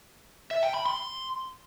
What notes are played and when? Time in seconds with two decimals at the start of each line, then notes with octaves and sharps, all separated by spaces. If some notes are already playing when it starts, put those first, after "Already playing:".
0.51 E5
0.63 G5
0.74 B5
0.86 C6